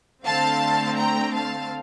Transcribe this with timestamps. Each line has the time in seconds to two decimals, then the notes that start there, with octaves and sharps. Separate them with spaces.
0.25 D3 A3 C4 F5 A5
0.97 G5 A#5
1.33 F5 A5